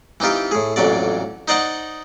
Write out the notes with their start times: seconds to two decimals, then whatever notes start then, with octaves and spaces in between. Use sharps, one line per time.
0.20 E3 C4 D#4 F4 G4
0.51 A2 G#4
0.76 A1 F2 A#2 F#3 D5
1.48 D#4 C5 D5 D#5 F#5 C#6